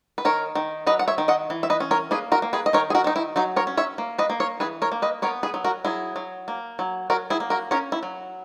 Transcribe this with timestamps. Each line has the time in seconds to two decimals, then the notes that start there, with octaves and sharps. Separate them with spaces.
0.18 B4
0.25 D#3 A#4 C#5
0.55 D#3
0.87 F#3 B4 D#5
0.99 F#5
1.08 C#5 E5
1.18 D#3
1.28 D#5 F#5
1.50 E3
1.63 E5
1.70 B4 D#5
1.80 C#4
1.91 A#4 C#5
2.11 A#3 G#4 B4
2.32 F#4 A#4
2.42 A#3
2.53 G#4 B4
2.66 D#5
2.73 D#3 A#4 C#5
2.90 G#4
2.95 F#4 A#4
3.04 D#3 D#4
3.16 E4
3.36 F#3 D#4 F#4
3.56 A#4 C#5
3.67 C#4
3.77 C#5 E5
3.98 A#3
4.18 B4 D#5
4.30 A#3
4.40 A#4 C#5
4.60 E3 G#4 B4
4.82 A#4 C#5
4.92 A#3
5.02 B4 D#5
5.22 B3 A#4 C#5
5.43 G#4 B4
5.54 F#3
5.64 F#4 A#4
5.85 F#3 E4 G#4
6.16 F#3
6.48 A#3
6.79 F#3
7.10 F#3 F#4 A#4
7.30 E4 G#4
7.40 A#3
7.50 F#4 A#4
7.71 C#4 A#4 C#5
7.92 E4
8.03 F#3